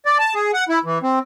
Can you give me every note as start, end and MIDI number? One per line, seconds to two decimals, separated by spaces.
0.06 0.18 74
0.19 0.34 81
0.35 0.51 68
0.53 0.64 78
0.69 0.79 64
0.85 0.99 52
1.03 1.19 60